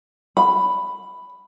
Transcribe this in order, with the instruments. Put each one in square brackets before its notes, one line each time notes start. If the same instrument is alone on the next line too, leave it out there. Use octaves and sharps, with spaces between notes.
[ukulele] B5